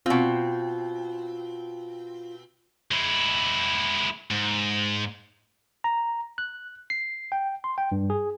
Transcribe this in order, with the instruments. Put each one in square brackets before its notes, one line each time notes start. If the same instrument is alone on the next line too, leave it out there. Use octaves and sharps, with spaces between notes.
[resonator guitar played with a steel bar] B2 C4 [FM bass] F4
[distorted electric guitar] G#3 E4
G#2
[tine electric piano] A#5
F#6
C7
G5
C6
G5
G2
G#4